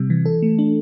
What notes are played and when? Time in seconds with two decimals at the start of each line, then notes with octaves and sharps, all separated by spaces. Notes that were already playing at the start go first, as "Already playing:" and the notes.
Already playing: C3 G3
0.10 E3
0.26 A4
0.42 A3
0.59 D4